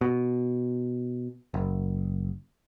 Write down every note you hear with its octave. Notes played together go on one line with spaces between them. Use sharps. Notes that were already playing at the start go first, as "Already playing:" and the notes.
B2
F#1